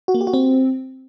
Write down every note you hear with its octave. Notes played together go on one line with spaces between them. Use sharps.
F#4
A#3
G4
F#4
C4